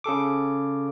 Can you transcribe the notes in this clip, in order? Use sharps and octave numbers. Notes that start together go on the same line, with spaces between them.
C#3 G#4 A4 D6